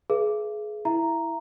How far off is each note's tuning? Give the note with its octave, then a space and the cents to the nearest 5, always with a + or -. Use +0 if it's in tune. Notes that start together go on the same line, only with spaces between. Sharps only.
G#4 +25 B4 -25 E5 +45
E4 +0 E5 +30 A#5 +0